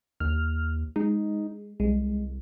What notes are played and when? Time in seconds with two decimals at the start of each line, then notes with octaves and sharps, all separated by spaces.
0.20 D#2 F6
0.96 G#3 D#4
1.80 C2 G#3